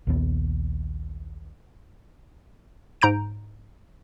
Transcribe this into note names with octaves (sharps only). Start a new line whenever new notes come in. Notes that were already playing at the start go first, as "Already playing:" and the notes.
A#1 D#2 B3
G#2 A#5 G6 D7